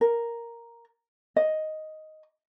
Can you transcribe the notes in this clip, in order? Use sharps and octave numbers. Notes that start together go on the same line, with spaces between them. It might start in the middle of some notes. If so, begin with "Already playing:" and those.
A#4
D#5